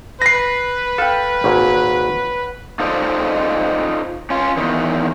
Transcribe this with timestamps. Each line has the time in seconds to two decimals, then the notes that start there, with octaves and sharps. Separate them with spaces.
0.22 B4 A#6 C7
0.98 A4 F5 G5
1.44 G#1 A#2 C#5 F#5
2.80 D#4 F4 A4 C5 D5 D#5
4.30 C#4 F4
4.56 E2 D#3